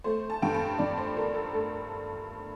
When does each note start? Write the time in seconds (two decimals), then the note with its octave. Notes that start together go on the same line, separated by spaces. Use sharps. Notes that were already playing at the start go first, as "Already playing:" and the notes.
0.04 A3 C5
0.30 A5
0.42 G2 G5
0.55 A5
0.79 G2 D5
0.98 C5
1.16 D3 A#4
1.34 A4
1.53 A3 A4